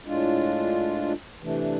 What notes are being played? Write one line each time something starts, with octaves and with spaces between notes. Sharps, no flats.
A2 G#3 D4 F4
C3 E3 A3 D4